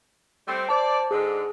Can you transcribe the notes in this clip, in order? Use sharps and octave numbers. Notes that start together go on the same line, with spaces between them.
G3 A3 C4
C5 D5 A5
G#2 D3 G#4